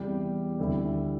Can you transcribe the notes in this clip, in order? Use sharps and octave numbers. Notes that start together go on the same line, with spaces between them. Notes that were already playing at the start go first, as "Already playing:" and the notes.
Already playing: E2 C3 G3 E4 G4
D2 C3 G3 E4